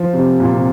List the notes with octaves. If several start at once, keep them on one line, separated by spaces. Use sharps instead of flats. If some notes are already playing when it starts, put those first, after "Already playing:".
Already playing: F3
C3
A#2
C3